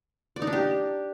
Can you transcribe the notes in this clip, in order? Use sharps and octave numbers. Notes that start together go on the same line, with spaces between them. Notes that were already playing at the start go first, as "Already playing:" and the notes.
D5
D#4
D4
G4